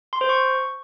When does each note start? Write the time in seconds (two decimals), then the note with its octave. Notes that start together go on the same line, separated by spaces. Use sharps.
0.13 C6
0.21 C5
0.29 C#6